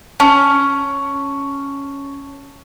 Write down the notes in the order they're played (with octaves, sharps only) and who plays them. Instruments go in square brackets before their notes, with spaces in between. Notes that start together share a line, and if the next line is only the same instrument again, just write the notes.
[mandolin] C#4 [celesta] A5 F6